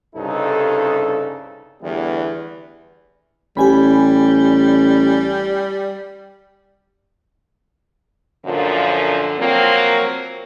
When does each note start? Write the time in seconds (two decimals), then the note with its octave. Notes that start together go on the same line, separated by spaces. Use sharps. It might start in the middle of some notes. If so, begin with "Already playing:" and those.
0.16 C2 G2 C#3 D#4 A4
1.82 E2 D3 E3 G3 A3 B3
3.57 A1 G3 G4 G#5 B5
8.45 F#2 A#2 D3 F3
9.37 F3 F#3 A#3 C4